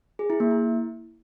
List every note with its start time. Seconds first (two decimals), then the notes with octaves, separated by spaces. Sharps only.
0.19 G#4
0.30 E4
0.40 A#3
0.51 E4